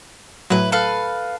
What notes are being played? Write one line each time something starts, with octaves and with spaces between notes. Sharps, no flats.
A2 F#3 E4 B4
A4 B4 F5